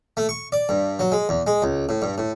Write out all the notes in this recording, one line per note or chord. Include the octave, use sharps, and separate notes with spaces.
A3
C#6
D5
G2
F#3
G#3
E2
G#3
C#2
A2
G2
A2